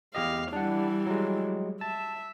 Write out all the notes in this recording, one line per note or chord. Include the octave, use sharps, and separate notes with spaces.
E2 G4 D#5 F5
E3 G3 D4 F#5
F#3 G#3
E5 A5